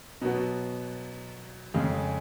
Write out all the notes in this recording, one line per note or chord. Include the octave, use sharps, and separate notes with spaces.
B2 F#3 B3 F#4
F2 C#3 G#3